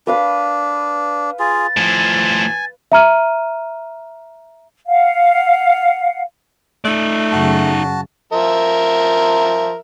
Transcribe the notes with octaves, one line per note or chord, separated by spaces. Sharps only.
D4 B4 F5 B5
F4 G#4 A6
A2 F3 G#5
E5 A#5 F6 D#7
F5 F#5
A3 D#4 D5
F#2 C#3 F#4 A5
F3 A#4 E5